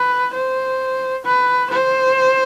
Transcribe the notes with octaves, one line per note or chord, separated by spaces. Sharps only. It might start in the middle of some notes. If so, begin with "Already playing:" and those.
Already playing: B4
C5
B4
C5